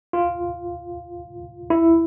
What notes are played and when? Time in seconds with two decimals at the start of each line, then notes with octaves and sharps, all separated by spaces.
0.13 F4
1.70 E4